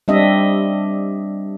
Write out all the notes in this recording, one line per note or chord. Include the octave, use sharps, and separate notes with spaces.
G3 C4 D4 D#5 E5